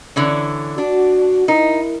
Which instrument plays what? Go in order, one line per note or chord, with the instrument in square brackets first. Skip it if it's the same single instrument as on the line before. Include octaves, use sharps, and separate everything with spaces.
[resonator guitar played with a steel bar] D3 E3 C#4
[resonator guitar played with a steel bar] D4 [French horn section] F#4
[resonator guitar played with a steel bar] D#4 [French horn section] E4 A#4